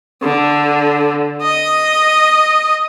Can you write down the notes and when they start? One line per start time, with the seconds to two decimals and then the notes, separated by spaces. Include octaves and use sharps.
0.23 D3
1.42 D#5